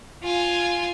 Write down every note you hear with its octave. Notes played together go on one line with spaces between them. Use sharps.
F4 G#5